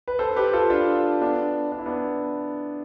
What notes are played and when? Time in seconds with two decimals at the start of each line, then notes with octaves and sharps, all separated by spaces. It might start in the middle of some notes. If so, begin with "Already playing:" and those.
0.08 B4
0.19 A4 C5
0.31 A4
0.36 G4 B4
0.53 F4 A4
0.70 D4 F4
1.21 B3 D4
1.72 D4
1.79 E4
1.86 B3 D4